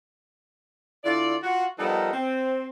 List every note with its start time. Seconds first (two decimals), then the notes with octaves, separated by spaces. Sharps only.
1.04 D3 E4 F4 D5
1.43 F4 F#4
1.79 F3 G3 B3 D#4 A4 A#4
2.13 C4